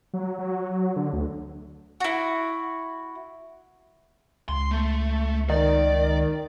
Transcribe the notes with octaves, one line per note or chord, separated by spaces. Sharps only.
F#3
F#3
D3
D2
E4 F#4
C#2 C6
A3
D#3 D5